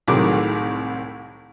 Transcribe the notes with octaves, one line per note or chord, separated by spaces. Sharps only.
C2 A2 D#3 F#3 G#4 D6